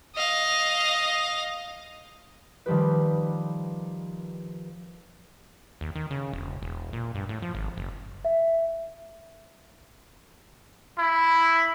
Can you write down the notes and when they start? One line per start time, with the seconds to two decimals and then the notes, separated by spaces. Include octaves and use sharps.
0.15 D#5 F5
2.66 D#3 F3 G3 G4 B4
5.81 D#2
5.95 D#3
6.11 C#3
6.33 E1
6.63 E1
6.93 A#2
7.15 G2
7.29 A2
7.42 F3
7.54 G#1
7.77 F#1
8.25 E5
10.98 E4